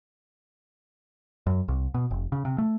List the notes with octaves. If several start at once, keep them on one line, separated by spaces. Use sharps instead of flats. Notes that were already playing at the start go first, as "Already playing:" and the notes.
F#2
C2
B2
F1
C#3
C3
A3